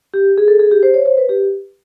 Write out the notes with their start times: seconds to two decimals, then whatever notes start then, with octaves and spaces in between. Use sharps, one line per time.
0.14 G4
0.38 G#4
0.48 A4
0.59 G#4
0.71 G4
0.83 C5
0.94 C#5
1.06 C5
1.17 B4
1.29 G4